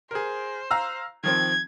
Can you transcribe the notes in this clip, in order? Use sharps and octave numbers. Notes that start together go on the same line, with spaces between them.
G#4 A#4 C5
F5 A#5 E6
D#3 F3 C4 G#6